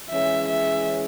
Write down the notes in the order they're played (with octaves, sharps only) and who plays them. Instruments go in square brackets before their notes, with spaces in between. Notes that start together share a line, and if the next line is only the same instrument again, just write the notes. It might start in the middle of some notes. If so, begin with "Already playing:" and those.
[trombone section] E3 G#3 C#4 G#4 [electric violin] E5
[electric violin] E5